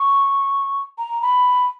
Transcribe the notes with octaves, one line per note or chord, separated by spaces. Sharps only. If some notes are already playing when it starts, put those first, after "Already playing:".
Already playing: C#6
A#5
B5